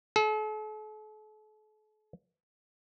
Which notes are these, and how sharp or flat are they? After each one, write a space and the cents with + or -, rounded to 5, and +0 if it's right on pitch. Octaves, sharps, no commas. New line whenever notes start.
A4 -40